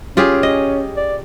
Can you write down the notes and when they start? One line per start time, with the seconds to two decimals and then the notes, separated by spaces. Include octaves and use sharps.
0.17 C#4 F4 G4 G#4
0.43 D#5
0.97 D5